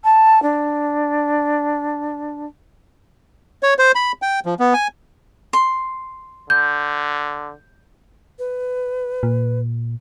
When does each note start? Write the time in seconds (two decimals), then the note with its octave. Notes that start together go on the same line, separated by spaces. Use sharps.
0.03 A5
0.42 D4
3.63 C#5
3.79 C5
3.95 B5
4.22 G5
4.46 F3
4.60 B3
4.74 G#5
5.53 C6
6.50 D3 G6
8.39 B4
9.23 A#2